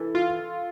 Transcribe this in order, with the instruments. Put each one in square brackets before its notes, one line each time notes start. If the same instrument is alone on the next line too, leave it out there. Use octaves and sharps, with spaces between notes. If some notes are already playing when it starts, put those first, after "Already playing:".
Already playing: [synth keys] E3 [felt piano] A4
[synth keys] F4